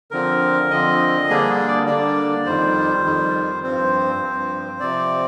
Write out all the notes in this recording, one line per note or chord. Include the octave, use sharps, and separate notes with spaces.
D3 F3 C4 A#4
D3 F3 C4 D#5
D3 G3 A#3 D4 G#4
D5
D3 G3 A#3 D4 D5
F2 D#3 G3 C5
F2 D#3 G3
G2 F3 C4 C5
G2 F3 C4
C3 F3 C4 D5